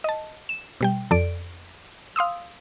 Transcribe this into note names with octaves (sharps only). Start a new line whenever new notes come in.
D#5 A5
E7
B2 G3 G5
F2 A4 D5 D7
F5 C6 D#6 E6